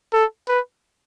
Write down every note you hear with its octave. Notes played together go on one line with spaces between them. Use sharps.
A4
B4